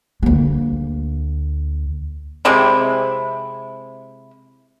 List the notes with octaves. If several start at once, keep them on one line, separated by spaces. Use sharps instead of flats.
D2 A#3
C3 G#3 C4 E4